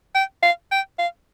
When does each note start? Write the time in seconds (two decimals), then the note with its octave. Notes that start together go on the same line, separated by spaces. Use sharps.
0.15 G5
0.43 F5
0.72 G5
0.99 F5